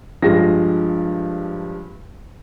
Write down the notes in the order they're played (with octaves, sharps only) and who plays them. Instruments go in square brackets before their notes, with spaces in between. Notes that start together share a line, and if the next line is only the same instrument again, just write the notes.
[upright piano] G2 F3 G#3 A#6